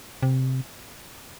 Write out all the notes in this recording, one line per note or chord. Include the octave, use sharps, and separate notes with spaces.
C3